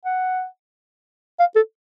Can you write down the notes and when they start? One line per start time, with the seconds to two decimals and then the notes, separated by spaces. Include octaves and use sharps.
0.05 F#5
1.40 F5
1.56 A4